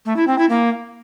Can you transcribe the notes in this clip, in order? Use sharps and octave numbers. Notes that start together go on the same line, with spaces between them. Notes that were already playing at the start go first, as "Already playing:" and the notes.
A3
E4
C4
E4
A#3